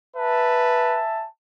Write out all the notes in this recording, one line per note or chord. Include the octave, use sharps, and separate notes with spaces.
B4 E5 G#5 A5